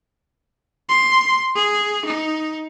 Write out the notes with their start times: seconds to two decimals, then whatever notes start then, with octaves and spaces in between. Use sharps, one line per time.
0.89 C6
1.55 G#4
2.05 D#4